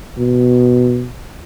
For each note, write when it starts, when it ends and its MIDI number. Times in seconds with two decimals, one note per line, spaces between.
0.18 1.08 47